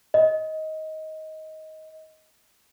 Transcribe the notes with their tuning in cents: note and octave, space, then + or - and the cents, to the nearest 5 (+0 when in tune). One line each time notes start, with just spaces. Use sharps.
D#5 +15